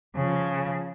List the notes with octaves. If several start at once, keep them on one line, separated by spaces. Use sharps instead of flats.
C#3 F3